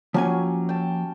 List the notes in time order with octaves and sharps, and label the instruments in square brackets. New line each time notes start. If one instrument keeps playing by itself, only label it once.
[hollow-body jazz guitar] F3 A#3 G#5 [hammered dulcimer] F#3 C#4 G4
[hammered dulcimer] G5 A5